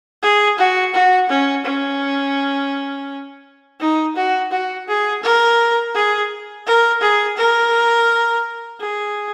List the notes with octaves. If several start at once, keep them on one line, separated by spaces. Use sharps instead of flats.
G#4
F#4
F#4
C#4
C#4
D#4
F#4
F#4
G#4
A#4
G#4
A#4
G#4
A#4
G#4